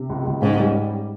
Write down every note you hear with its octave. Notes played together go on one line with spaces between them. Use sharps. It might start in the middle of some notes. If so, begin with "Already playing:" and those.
Already playing: C3
C#2
C#2
G#2 C#4
G3